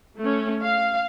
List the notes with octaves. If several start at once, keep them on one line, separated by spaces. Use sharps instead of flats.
A3 C#4
F5